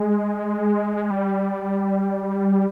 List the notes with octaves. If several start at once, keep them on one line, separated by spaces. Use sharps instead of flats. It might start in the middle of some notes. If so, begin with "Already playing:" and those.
Already playing: G#3
G3